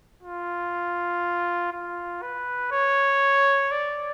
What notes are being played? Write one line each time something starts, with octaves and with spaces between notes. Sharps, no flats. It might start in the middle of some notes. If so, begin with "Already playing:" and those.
F4
F4
B4
C#5
D5